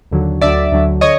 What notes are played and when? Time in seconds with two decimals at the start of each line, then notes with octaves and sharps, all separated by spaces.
0.11 D#2 D3 F#3
0.41 D2 D3 F#3 D5 E5
0.72 D2 D3 F#3
1.01 D3 C#5 D#5